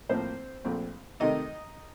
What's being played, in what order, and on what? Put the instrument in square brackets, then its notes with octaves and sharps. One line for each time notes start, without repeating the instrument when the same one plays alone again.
[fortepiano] A2 F3 A#3 C4 C5
A#1 A#2 A3 C4
C3 D#3 A3 D#4 D#5